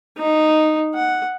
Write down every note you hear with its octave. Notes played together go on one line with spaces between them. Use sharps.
D#4
F#5